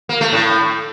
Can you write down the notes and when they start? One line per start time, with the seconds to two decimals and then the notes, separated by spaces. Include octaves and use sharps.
0.09 A#3
0.21 A3
0.32 A2